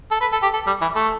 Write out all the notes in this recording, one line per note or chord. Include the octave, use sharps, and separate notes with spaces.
A4
B4
A4
G4
A4
G3
E3
A3